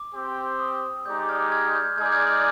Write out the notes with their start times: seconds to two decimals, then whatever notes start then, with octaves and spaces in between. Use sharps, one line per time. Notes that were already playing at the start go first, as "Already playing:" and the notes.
Already playing: D6
0.12 C4 G4 C5
0.59 D#6
1.06 G#3 D#4 G4 D5 G6
1.29 F6 G#6
1.52 F6 G#6
1.75 G6
1.98 G#3 D#4 G#4 D5 G#6
2.06 G6
2.12 F6 G#6
2.28 F6